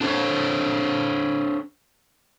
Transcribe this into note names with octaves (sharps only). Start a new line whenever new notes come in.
D4 A4 C5 C#5